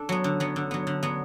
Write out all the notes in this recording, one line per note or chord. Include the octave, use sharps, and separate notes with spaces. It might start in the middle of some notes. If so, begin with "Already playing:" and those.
Already playing: D4 A4
F#3 B3
D3
F#3 B3
D3
F#3 B3
D3
F#3 B3